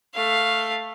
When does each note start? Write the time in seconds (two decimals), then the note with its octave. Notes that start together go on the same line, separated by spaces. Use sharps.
0.14 A3 F5